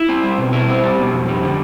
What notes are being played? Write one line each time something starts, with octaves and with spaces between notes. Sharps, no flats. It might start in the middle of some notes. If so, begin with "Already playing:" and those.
Already playing: E4
C4
G3
B2
E4
C4
G3
B2
F2
G3
D3